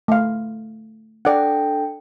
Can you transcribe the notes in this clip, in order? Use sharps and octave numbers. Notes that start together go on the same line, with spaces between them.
A3 F5
D4 A4 D5 F#5 G5